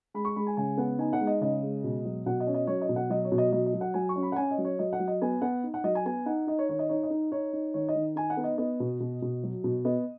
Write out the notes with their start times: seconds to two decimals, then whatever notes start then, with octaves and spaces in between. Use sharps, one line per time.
0.14 G#3 B5
0.25 C#6
0.36 G#3 B5
0.47 G#5
0.57 C#3 G#5
0.77 B3 F#5
0.99 D#4 G#5
1.13 F#5
1.20 G#3
1.27 D#5
1.41 C#3 D#5
1.63 G#3
1.84 B2
2.05 F#3
2.26 B2 F#5
2.40 D#5
2.47 C#4
2.54 D#5
2.67 F#3 C#5
2.81 D#5
2.89 B2
2.96 F#5
3.10 F#3 D#5
3.25 C#5
3.32 B2
3.38 D#5
3.52 F#3 D#5
3.66 D#5
3.74 F#3
3.81 F#5
3.94 F#3 G#5
4.09 C#6
4.16 C#4
4.23 B5
4.32 F#5
4.36 C#4 G#5
4.51 D#5
4.58 F#3
4.65 C#5
4.79 F#3 D#5
4.93 F#5
4.99 F#3
5.08 D#5
5.22 B3 G#5
5.42 B3 F#5
5.64 D#4
5.74 F#5
5.84 F#3 D#5
5.95 G#5
6.05 B3 G#5
6.26 D#4 F#5
6.47 D#4 D#5
6.59 C#5
6.69 D#3 C#5
6.79 D#5
6.89 D#4 C#5
7.03 D#5
7.10 D#4
7.32 D#4 C#5
7.53 D#4
7.74 D#3 C#5
7.89 D#5
7.95 D#3
8.16 D#4 G#5
8.30 F#5
8.37 B3
8.44 D#5
8.58 B3 D#5
8.80 B2
9.00 B2
9.22 B2
9.43 F#3
9.64 B2
9.85 B3 D#5